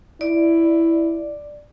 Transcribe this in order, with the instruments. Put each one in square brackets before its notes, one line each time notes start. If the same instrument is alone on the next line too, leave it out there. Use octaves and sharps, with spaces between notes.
[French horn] E4 [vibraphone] D5